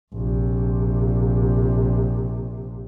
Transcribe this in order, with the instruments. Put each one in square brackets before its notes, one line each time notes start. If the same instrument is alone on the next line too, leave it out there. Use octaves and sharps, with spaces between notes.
[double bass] A#1 C3